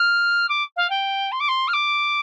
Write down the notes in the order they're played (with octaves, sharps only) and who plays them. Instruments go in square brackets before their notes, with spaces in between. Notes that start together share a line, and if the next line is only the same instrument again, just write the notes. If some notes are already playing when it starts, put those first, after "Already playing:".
Already playing: [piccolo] F6
D6
F5
G5
C6
D6
C6
F6
D6